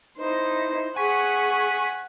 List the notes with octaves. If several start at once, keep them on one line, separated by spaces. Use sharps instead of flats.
D#4 E4 C5
G#4 F#5 G#5 C#6 B6